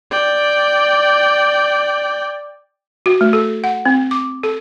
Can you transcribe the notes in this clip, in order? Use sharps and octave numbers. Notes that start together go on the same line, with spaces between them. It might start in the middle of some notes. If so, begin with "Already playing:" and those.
D5 G5
F#4
A3
A4
F#5
C4
D6
A4